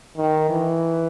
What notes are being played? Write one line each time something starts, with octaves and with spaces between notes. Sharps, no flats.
D#3
E3